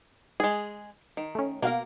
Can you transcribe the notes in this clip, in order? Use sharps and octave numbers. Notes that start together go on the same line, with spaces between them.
G#3 G#4
D#3
A3 C#4
B2 A#3 F#4 A#4 F5